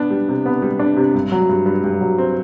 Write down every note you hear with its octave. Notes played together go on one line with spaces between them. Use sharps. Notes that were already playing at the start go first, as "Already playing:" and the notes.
Already playing: B3 D4
G3
C3
B3
G3
D4
C3
G2
F#3
G2
G2
G2
F#3
C4